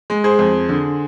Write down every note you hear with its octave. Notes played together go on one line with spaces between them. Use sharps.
G#3
G#4 C5
F2
D3